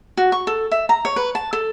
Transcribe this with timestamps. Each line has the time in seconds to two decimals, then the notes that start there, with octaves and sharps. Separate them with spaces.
0.17 F#4
0.32 C#6
0.47 A4
0.71 E5
0.89 A#5
1.05 C#5
1.16 B4
1.35 A5
1.53 A4